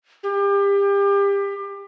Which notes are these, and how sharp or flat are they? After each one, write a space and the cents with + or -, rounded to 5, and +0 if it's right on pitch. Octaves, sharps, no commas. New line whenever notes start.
G4 +30